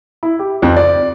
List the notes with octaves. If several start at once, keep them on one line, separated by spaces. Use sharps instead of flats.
E4
G4
F2
D5